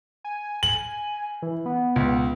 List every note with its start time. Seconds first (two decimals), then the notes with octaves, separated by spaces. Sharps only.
0.24 G#5
0.63 F#7
1.42 E3
1.66 B3
1.96 C#2